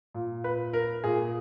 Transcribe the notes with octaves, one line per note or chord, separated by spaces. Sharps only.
A#2
B4
A#4
A#2 G#4